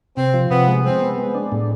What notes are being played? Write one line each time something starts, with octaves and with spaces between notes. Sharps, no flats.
C3 C4
F3
C3 B3
G#3
G#3 C4
B3
G#3
D4
A2